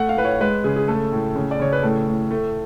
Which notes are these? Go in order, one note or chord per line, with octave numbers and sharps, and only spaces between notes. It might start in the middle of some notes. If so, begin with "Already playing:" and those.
Already playing: A3 F#5
F5
A2 B4
C#5
G#3 B4
C#3 G#4
G#4
A3 A4
A2
C#3
D5
C#3 C#5
B4
A2 A4
A2
A3